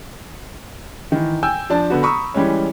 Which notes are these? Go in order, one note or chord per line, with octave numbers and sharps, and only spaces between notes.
D#3 E3
G5 G#5 E6 G6
F3 D4 A5
D3 B3 F#4
A#5 B5 C#6 D#6 E6
E3 G3 G#3 C#4